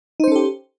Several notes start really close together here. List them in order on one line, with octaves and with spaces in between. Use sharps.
D#4 C5 C#4 A4 G4